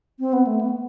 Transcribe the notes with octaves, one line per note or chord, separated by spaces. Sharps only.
C4
B3
A3
B3